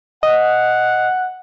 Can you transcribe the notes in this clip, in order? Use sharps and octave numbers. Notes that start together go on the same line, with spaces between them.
D#5 F#5